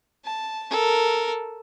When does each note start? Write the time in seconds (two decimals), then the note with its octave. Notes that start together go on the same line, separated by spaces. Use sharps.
0.25 A5
0.70 A4 A#4